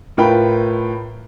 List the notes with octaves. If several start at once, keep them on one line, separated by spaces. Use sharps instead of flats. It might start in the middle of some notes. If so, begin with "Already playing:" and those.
A2 F4 A#4 B4 G5 B5